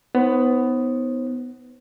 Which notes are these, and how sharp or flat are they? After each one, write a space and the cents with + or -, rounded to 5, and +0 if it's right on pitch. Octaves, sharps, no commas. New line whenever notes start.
B3 +15 D#4 +20 C5 +40